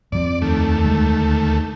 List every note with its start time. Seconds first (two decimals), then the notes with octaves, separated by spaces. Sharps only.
0.12 F2 F3 C4 D5
0.42 D#2 A3
0.84 D2 G#3